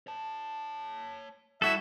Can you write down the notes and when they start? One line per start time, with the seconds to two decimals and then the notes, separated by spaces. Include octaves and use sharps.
0.07 C#5 A5
1.62 G3 E4 F#4 A4 E5